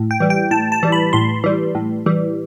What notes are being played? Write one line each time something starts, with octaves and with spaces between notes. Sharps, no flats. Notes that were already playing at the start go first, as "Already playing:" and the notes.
Already playing: A2
G5
E3 G3
G5
A2 A5
A5
E3 G3
B5
A2 C6
E3 G3
A2
E3 G3